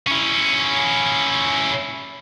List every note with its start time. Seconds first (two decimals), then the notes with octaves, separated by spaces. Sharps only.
0.07 C#4 E4